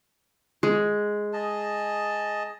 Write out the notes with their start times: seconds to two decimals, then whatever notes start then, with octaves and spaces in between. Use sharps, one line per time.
0.63 G#3
1.33 G#4 D#5 A5